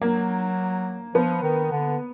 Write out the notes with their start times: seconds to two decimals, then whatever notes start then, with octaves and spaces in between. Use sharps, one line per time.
0.01 F#3 A#3
1.14 F3 B3
1.42 D#3
1.71 D3